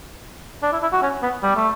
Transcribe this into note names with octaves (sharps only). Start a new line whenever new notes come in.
D4
E4
E4
F#4
C#4
B3
G3
A3